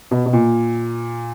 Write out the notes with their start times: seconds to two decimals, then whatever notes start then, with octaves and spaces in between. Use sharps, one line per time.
0.11 B2
0.26 B2
0.33 A#2